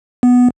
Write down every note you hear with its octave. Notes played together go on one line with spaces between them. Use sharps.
B3